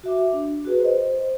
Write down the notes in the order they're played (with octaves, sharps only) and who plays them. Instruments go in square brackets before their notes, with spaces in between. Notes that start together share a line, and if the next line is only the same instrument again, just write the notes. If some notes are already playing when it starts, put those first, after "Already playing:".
[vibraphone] F#4 E5 D6
D4
F#4 G#4 B4
C5 D#5